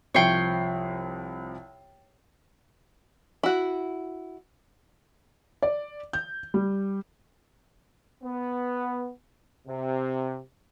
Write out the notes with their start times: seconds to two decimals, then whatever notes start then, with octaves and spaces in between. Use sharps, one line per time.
0.14 C2 F3 C#5 G5 C7
3.43 E4 F#4
5.63 D5
6.13 G6
6.54 G3
8.23 B3
9.68 C3